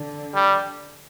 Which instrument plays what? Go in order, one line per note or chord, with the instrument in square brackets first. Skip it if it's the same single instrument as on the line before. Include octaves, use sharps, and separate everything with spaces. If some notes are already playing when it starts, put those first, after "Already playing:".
Already playing: [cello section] D3
[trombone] G3